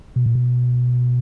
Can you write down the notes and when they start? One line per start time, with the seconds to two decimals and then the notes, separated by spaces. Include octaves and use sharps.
0.16 B2
0.26 A#2
0.35 B2